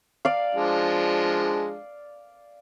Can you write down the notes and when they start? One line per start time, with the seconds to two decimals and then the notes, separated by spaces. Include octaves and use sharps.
0.25 D5 F5
0.55 F3 G#3 D4